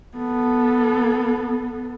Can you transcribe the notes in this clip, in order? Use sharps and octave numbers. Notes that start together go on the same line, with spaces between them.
B3 A4